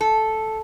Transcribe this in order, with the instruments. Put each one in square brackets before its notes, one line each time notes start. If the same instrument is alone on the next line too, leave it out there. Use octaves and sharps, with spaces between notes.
[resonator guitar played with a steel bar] A4